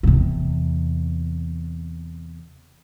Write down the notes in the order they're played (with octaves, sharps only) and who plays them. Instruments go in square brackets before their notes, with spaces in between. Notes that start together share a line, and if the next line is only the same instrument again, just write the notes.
[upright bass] E2 C3